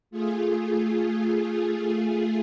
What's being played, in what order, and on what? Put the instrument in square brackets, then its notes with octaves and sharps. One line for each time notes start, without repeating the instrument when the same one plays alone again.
[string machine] A3 F4 G#4